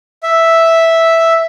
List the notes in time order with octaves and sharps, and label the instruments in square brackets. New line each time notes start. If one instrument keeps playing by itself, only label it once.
[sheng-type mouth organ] E5